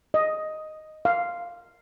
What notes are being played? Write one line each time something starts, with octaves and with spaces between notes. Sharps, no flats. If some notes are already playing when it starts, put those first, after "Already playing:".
D#5
F5